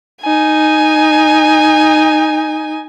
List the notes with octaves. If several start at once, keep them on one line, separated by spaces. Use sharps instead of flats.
D#4 G#5